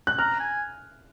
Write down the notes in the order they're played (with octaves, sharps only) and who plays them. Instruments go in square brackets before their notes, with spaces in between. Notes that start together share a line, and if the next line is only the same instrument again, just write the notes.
[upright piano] F#6
[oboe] A#5 [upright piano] F6
[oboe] G#5